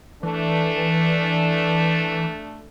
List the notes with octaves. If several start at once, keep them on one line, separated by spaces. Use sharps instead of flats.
E3 A3 D4 A4